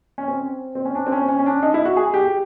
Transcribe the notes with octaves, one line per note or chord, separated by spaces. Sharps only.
C#4
C4
C4
C#4
D4
C4
C#4
C#4
C#4
D4
D#4
E4
F#4
G#4
G4